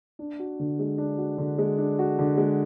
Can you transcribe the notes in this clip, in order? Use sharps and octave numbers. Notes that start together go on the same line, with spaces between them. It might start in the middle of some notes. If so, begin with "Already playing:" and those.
D4
F#4
D3
G#3
D4
F#4
D3
G#3
D4
F#4
D3
G#3